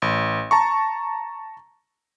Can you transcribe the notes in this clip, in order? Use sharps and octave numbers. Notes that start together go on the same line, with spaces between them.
A1
A5 A#5 C#6